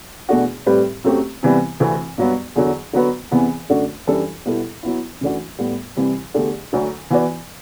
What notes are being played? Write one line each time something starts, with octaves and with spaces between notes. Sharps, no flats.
E2 B2 A3 D4 F#4
A2 G3 C4 G4 B4
F#2 F#3 A3 C4 G4
C3 E3 G3 B3
D2 C3 E3 A3 C4
G2 F#3 B3
E2 D3 F#3
D3 F#3 B3 F#4 B4
E2 C3 E3 B3
F#2 D3 A3 D4 F#4
F#2 E3 G3 D4 A4
B2 G3 B3 E4 A4
F#3 B3 E4
F#2 E3 A3 D4 F#4
A2 G3 B3
C2 C3 E3 G3
E2 D3 A3 D4 G4
D2 D3 F#3
E3 B3 F#4 B4 D5